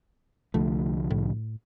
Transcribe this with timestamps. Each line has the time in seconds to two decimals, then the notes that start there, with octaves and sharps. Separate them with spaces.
0.54 C2 D3 F3 A3
1.11 A2